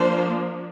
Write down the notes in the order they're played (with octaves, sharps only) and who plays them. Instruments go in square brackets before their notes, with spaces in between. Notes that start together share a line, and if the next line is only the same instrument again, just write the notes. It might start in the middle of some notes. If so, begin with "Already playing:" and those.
Already playing: [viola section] F3 A#3 D4 C5